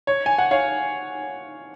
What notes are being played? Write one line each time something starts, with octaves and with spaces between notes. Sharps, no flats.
C#5
G#5
F#5
C#5 F5